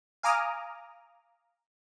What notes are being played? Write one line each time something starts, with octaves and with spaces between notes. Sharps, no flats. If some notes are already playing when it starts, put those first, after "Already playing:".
F5 G#5 A#5 D6 D#6 F6